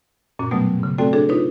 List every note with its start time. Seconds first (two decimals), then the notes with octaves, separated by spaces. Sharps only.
0.39 F#2 A#2 C#4 F#4
0.51 B2 F#3 G3 A3 B3
0.79 G#2 C#3
0.98 A3 C4 F#4 A4 D5 G5
1.13 D4 F#4 G#4 A4 C#5
1.29 D4 D#4 F4 B4 C#5